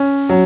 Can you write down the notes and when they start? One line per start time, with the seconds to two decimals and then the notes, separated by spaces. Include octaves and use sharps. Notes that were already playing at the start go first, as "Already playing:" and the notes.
Already playing: C#4
0.29 F#3